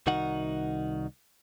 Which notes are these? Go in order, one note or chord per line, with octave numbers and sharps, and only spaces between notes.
C2 D#3 D#4 F#4 F#5